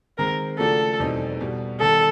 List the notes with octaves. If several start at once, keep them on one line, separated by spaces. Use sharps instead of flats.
D#3 G#3 C4 A#4
C#3 F3 A3 D4 F#4 A4
E2 B2 G3 C4 D#4
B2 G3 B3
D#3 G3 B3 A4